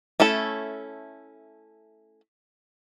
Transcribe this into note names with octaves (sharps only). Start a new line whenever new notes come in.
A3 C#4 E4 A4